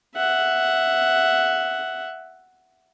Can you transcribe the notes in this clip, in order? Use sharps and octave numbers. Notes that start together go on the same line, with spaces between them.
E5 F#5